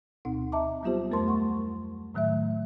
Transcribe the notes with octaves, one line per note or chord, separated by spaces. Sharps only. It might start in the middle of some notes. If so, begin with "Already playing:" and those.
D2 B2 C4 D#4 F#5
D#5 E5 A5 A#5 D6
F#3 G3 B3 F4 G4 C5
F2 A3 A#4 C5 A5 C6
F#5 C#6
A2 D#3 F#3 A3 E5